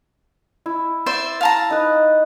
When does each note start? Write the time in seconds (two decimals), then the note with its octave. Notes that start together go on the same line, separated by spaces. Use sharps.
0.66 E4
1.06 C5 D5 E5
1.41 F5 A5 A#5
1.70 D#4 B4